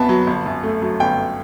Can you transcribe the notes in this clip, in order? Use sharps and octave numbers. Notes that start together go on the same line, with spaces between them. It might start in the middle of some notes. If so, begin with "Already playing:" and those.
Already playing: C2 B2 B3 A5 B5
F#3
G1
F#2
A3
F#3
G1 G5